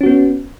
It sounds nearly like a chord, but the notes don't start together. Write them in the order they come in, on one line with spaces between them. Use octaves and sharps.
C#4 F#4 B3